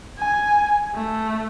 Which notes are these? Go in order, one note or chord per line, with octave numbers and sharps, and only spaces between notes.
G#5
A3